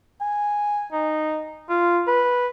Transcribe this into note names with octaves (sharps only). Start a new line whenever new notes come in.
G#5
D#4
F4
B4